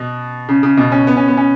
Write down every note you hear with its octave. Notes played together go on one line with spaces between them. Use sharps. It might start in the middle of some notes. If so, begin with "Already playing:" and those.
Already playing: B2
C#3
C#3
B2
C#4
B3
C#4
B3
C#4